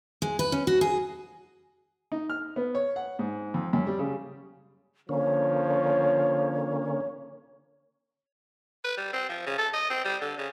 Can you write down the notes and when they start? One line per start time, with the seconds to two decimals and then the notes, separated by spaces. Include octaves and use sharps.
0.22 G#3
0.39 B4
0.52 C#4
0.67 F#4
0.81 G#4
2.12 D#4
2.30 F6
2.56 B3
2.75 C#5
2.96 F#5
3.19 G#2
3.54 F2
3.73 F#2
3.87 G3
3.99 C#3
5.09 D3 F3 A#3 C#4 C#5
8.84 B4
8.97 G3
9.13 C4
9.29 F3
9.46 C#3
9.58 A4
9.73 D#5
9.90 C4
10.04 G3
10.22 D3
10.38 C#3